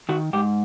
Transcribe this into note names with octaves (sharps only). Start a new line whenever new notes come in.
D#3 F#4
G#2 G4